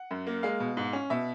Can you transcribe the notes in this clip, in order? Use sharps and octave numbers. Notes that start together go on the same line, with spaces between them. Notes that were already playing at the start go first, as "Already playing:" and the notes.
Already playing: F#5
F#2
A#3
G#3 F5
B2
G#2
C#4
B2 E5